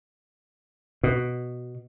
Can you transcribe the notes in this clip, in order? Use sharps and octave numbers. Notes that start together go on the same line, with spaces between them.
B2